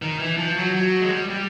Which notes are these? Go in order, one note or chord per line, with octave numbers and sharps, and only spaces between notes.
D#3
E3
F3
F#3
F#3
G#3
G3
G3